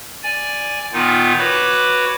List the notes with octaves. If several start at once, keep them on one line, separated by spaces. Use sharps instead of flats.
D5 G#5
A#2 D#3 B3 D#4 F4
F#4 B4 C#5 B5 D6